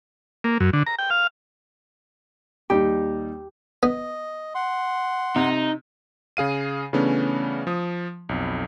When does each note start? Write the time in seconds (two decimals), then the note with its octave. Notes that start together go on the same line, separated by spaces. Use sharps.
0.44 A#3
0.60 F#2
0.73 D3
0.86 A#5
0.99 G5
1.10 F5
2.70 D#2 G3 D#4 G4
3.83 B3 D#5
4.55 F#5 C6
5.36 C3 D#4
6.37 C#3 G#4 F5 D#7
6.93 C#3 E3 A3 B3 C#4 D4
7.67 F3 D#6
8.29 B1 F2